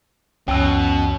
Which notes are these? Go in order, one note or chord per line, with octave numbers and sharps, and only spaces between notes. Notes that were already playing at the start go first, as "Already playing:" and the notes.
C#2 F#2 B2 E3 C#4 G5 A5 E6